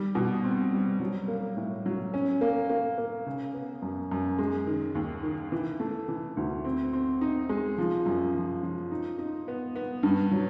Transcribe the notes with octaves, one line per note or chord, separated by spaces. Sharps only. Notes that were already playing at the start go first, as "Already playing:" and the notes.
Already playing: D#3 G3
B2
C4
G3
F#3
A#3
A2
F#3
C#4
A#3
A#3
A#3
C#3
B3
F#2
F#2
G#3
D#3
D#2
D#3
E3
A3
E3
D2
C4
C4
D#4
G#3
F3
F#2
F3
F3
D#4
D#4
B3
B3
G2
F#3